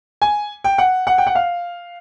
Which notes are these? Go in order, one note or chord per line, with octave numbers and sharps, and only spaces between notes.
G#5
G5
F#5
F#5
G5
F#5
F5